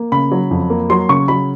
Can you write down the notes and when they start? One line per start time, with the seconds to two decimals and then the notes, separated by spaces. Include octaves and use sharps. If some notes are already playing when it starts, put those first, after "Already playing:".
Already playing: A#3
0.12 C#3 B5
0.32 F#3
0.51 F2
0.70 A#3
0.90 F#3 C6
1.09 C#3 C#6
1.28 F#3 B5